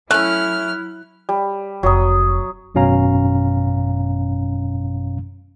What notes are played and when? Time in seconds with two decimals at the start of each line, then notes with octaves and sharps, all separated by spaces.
0.11 F#3 A3 C#4 E4 F6 F#6
1.29 G3
1.83 F1 F#3 D#6
2.75 G#1 F#2 B2 C#4 F5 A#5